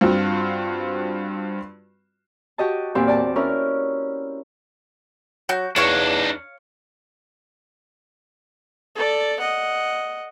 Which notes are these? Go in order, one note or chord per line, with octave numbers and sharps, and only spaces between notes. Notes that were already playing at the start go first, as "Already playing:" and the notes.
G2 C4 F4 F#4
F#4 G4 D#5 A5
E2 A#2 C4 G4
D5 A5
C#4 E4 A#4 F6
F#3 F#4 G6
E2 D4 D#4 C#5 F5 C#6
A4 D5
D#5 F#5